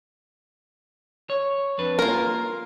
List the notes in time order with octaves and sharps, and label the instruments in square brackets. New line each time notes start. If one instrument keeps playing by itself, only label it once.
[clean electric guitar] C#5
F2 D4 B4
[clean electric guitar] A#3 [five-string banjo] F4 A#4